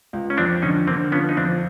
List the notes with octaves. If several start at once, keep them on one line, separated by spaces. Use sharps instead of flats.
C#2
C#4
F2 C4 D4
D3 C#4 D#4
D3 A#3 C4
F3 B3 C#4
D#4
F2 C4 D4